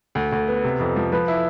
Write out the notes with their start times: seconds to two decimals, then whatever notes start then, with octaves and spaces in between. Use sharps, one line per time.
0.15 D2
0.32 D2
0.48 B3
0.64 C3
0.80 F2
0.96 F3
1.12 F3 B4
1.28 E4